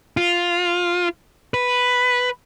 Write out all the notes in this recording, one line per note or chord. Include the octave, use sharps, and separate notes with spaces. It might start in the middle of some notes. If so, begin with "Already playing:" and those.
F4
B4